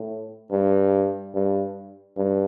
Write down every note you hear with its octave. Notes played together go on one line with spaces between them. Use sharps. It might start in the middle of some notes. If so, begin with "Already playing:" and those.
Already playing: A2
G2
G2
G2